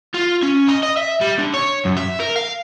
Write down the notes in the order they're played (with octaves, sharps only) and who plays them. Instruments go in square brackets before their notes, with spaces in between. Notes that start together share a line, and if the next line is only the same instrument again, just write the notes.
[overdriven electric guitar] F4
C#4
D#5
D#5
E5
G3
D3
C#5
F#2
E5
A#4
F5